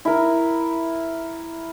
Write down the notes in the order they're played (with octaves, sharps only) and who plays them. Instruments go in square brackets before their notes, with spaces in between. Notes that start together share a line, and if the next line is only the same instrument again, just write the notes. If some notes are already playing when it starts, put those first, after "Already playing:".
[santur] E4 A#4